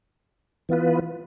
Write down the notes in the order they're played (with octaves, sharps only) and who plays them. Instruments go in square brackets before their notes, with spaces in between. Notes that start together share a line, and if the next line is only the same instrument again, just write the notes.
[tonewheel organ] E3 B3 F4 B4